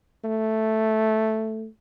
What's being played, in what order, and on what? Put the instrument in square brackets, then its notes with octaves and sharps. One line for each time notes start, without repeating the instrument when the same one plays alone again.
[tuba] A3